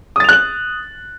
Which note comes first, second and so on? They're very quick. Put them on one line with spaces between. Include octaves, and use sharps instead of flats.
D#6 A6 F7 F#6 F#7